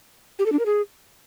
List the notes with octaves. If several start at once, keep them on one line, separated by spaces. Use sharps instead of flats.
G4
A4
D4
A#4
G#4